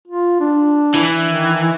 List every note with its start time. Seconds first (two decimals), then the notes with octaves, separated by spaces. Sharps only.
0.07 F4
0.40 D4
0.95 E3
1.26 D#3